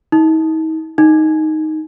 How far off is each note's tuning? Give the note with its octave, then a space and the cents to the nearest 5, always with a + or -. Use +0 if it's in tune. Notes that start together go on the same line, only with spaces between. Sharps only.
D#4 +40
D#4 +5